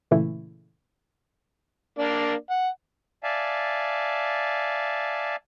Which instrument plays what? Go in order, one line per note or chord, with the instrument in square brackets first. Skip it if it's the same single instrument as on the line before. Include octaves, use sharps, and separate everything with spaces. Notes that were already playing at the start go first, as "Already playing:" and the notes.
[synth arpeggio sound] A#2 C#3 E3 A3 E4
[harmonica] A#3 D4 D5
F#5
[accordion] D5 E5 F5 G#5 A5